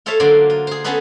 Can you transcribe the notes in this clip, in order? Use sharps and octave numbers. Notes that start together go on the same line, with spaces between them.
F4 A4 C5 C#5 E5 F5
D3 F#3 A#3 F4 C5 D5
F4
G#4 C5
B3 C#4 F#4 G#4 A4 B4